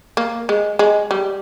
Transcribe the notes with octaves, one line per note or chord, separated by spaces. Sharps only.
A#3
G#3
G#3
G3